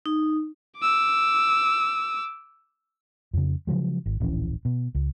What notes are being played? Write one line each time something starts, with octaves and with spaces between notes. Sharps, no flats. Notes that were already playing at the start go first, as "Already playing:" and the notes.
D#4
D6 E6
F2 C#3
C#3 F3 F#3 G#3
G#1
D1 A#1 E3 C#4
B2
C#2